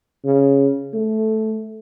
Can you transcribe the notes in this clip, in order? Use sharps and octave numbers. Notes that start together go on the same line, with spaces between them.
C#3
A3